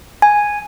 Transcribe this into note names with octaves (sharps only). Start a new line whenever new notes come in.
G#5